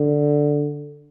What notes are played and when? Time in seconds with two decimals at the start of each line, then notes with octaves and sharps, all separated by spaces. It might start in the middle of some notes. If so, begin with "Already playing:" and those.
Already playing: D3